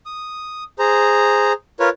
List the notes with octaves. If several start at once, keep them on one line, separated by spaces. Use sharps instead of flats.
D#6
G#4 C5 A#5
F4 A#4 B4 C#5